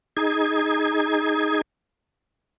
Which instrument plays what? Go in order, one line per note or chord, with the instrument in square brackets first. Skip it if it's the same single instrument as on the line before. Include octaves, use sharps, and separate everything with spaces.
[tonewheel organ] D#4 G#4 G#6